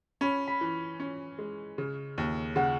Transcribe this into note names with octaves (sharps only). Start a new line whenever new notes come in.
C#4 B5
B5
E3
C#4
G#3
C#3
D#2
C#3 F#5